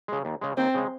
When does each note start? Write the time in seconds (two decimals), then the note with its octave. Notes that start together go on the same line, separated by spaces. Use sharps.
0.08 C#3 G#3
0.25 D#2
0.41 C#3 G#3
0.57 D#2 C4
0.75 C#3 G#3